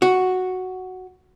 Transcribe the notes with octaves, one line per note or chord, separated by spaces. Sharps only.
F#4